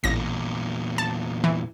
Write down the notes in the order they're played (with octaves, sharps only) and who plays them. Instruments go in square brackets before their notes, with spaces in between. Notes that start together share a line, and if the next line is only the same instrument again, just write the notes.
[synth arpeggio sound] A1 A#6 [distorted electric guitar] E2 A#2
[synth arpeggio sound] A5
E3